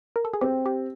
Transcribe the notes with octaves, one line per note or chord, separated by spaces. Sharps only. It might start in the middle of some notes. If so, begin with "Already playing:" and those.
A#4
A4
G#4
C4 G4
G4